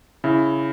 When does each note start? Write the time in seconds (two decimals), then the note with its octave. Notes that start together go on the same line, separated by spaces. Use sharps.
0.24 C#3 E4